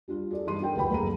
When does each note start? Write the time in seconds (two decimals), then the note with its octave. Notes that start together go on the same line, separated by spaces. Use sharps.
0.08 G3 D4 F4 G4
0.31 G#4 A4 D5
0.46 G2 E3 D#4 G4 C6 D#7
0.60 D4 E4 G#4 A#4 F#5 G5
0.76 F1 D2 B4 G5 B5
0.90 F1 A#1 F#2 A4 A#5 D#7